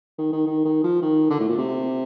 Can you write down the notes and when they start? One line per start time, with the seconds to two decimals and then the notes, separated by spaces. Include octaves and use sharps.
0.19 D#3
0.33 D#3
0.46 D#3
0.65 D#3
0.84 F3
1.02 D#3
1.30 D3
1.40 A2
1.49 A#2
1.58 C3